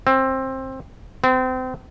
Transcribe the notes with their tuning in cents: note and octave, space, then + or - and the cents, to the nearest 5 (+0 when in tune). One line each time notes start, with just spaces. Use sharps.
C4 +20
C4 -30